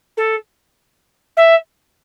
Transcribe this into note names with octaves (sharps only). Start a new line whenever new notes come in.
A4
E5